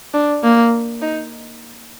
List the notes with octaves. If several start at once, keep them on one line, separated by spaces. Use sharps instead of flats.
D4
A#3
D#4